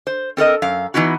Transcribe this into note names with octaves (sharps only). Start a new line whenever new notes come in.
C5
C4 A4 A#4 D#5
F#2 F5
E3 B3 D#4 E4 F#4